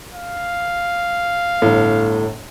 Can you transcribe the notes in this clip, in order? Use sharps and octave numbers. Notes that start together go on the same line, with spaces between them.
F5
G1 A2